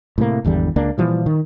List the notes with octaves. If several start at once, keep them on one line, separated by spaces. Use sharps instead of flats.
A2 C3 A#3
G#1 E2 D3 G3
C#2 A#3 D4
A#2 E3 F3 G3
D#3